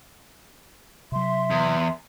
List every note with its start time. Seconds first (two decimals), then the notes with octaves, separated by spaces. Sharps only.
1.12 C3 F#3 E5 C6
1.51 E2